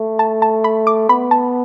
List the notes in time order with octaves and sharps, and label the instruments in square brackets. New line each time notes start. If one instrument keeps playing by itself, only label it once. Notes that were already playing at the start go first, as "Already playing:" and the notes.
Already playing: [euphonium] A3
[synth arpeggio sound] A5
A5
B5
D6
[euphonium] B3 [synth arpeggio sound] B5
[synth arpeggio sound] A5